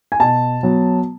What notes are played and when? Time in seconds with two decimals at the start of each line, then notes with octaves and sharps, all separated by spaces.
0.12 G#5
0.20 B2 A5
0.63 F#3 B3